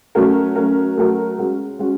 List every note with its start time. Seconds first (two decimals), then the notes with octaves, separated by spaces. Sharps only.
0.15 F#3 A3 C#4 F#4 A#4
0.55 F#3 A3 C#4 F#4 A#4
0.97 F#3 A3 C#4 F#4 A#4
1.38 G#3 C#4 F#4
1.79 G#3 C#4 F#4